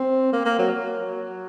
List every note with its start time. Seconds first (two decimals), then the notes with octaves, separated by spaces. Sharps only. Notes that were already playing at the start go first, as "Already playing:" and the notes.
Already playing: C4
0.32 A#3
0.45 A#3
0.59 F#3
0.72 F#3